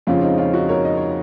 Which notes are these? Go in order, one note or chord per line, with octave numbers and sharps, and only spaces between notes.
F2 C#3 F3 G#3 C#4 F4
C4 D#4
C#4 F4
D#4 F#4
A#4 C#5
D#5
C#5